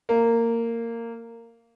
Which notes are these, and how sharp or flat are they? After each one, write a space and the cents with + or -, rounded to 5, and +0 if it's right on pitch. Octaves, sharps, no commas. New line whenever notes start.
A#3 -15